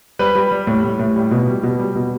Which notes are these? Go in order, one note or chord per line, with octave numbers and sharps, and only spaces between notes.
G3 B4
G3
G3
A2
A2
A2
G3
B2
G3
B2
G3
B2